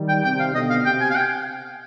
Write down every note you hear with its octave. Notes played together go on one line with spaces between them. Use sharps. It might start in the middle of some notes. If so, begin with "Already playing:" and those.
Already playing: D#3 G3
G5
C3 G5
F5
B2 D3 D#5
F5
C3 G5
G#5
F5
G5